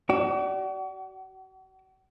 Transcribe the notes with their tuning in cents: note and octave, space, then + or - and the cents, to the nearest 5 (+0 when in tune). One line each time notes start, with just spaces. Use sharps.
F#4 +40 D5 -10